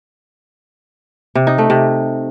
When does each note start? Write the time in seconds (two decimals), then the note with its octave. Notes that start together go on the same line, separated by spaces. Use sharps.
1.35 C3
1.47 D#4
1.58 A3
1.70 C3